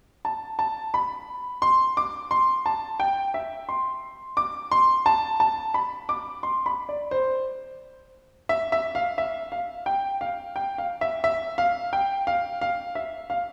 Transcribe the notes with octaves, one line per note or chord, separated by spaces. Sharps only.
A5
A5
B5
C6
D6
C6
A5
G5
E5
C6
D6
C6
A5
A5
B5
D6
C6
B5
D5
C5
E5
E5
F5
E5
F5
G5
F5
G5
F5
E5
E5
F5
G5
F5
F5
E5
F5